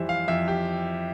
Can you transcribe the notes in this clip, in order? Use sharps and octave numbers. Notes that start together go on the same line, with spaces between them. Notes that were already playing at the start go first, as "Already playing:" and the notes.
Already playing: F2 E3 G3 C5 E5
F5
F2 E5
G4